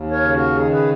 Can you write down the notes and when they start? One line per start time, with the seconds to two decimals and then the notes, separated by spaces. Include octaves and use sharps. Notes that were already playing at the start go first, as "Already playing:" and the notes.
Already playing: D#2
0.11 A#4 C#5
0.22 C#3
0.33 F#4 A#4
0.55 D#3 G#4
0.72 G#4 B4